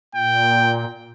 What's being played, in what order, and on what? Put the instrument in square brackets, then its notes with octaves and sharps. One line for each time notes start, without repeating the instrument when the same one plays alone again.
[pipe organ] A#2 [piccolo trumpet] G5